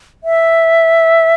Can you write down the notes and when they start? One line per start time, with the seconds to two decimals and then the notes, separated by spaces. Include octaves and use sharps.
0.24 E5